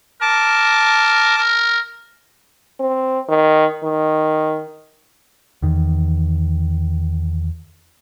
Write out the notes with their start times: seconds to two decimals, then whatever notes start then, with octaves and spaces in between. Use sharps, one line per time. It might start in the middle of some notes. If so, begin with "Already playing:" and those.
0.22 A#4 A5 D6
1.38 A#4
2.80 C4
3.29 D#3
3.84 D#3
5.62 E2 D#3